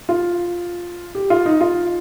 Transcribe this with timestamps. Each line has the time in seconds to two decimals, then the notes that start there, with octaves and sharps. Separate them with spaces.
0.09 F4
1.15 G4
1.30 F4
1.46 D#4
1.61 F4